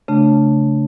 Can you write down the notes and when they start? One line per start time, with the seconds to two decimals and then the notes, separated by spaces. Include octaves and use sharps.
0.08 C#3 A3 D4